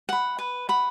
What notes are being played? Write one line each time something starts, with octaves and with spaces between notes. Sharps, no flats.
F#5 B5
B4
F#5 B5